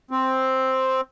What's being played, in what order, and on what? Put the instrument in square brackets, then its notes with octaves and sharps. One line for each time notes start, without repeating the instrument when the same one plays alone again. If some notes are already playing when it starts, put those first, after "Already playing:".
[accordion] C4